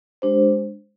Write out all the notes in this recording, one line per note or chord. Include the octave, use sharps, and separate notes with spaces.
G#3 D4 G4 C5